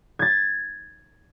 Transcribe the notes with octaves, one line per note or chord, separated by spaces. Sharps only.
G#6 A6